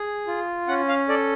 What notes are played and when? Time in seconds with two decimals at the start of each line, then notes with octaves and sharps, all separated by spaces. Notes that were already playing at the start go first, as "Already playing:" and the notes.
Already playing: G#4
0.27 F4
0.68 C#4 F#5
0.88 F5
1.09 A4 D5